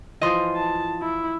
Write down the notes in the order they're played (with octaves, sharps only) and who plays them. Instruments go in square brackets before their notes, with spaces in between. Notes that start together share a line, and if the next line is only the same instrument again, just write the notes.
[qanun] E3 F3 [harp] D#5 C6
[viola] A5
E4